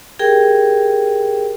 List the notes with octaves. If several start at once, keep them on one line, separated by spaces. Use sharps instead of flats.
G4 G#4 A#4 G5